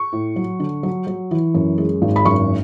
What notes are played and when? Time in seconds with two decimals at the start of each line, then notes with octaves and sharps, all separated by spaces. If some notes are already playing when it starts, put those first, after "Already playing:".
Already playing: C#6
0.12 A2
0.36 F#3
0.60 D3
0.83 F#3
1.07 F#3
1.31 E3
1.54 F#2
1.78 G#3
2.02 G#1
2.16 B5
2.25 F#1 C#6